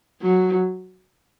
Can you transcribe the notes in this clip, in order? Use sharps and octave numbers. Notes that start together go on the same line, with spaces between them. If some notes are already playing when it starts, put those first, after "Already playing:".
F#3